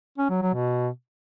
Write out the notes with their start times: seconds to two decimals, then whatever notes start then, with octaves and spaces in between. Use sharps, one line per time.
0.18 C#4
0.30 F#3
0.42 F#3
0.54 B2